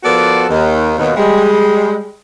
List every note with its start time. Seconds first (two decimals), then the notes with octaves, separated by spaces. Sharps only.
0.04 F3 B3 F#4 A4 A#4 D5
0.50 D#2 D#3
0.98 D#2 B2
1.17 G3 G#3